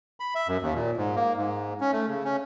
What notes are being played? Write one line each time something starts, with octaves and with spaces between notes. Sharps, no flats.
B5
E5
F#2
D#2
A#2
G#2
A#3
G#2
C#4
A3
C#3
C#4